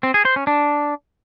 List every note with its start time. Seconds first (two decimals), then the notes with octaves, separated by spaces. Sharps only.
0.03 C4
0.14 G#4
0.25 C5
0.36 C#4
0.47 D4